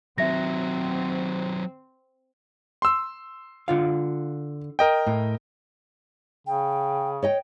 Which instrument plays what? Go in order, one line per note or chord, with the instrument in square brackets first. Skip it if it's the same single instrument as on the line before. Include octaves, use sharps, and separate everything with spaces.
[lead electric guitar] D#3 F#3 [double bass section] C4 [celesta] E5 A#6
[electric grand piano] C6 E6
[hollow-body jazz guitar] D3 F4 F5
[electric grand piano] A#4 D#5 G5
[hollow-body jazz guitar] A2
[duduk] C#3 [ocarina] G5
[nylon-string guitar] C#5 D#5 G5